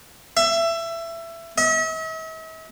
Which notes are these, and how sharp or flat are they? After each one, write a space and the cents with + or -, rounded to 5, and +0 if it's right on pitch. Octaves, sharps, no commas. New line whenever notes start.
E5 +20
E5 -45